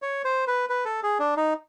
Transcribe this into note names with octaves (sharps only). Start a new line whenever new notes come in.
C#5
C5
B4
B4
A4
G#4
D4
D#4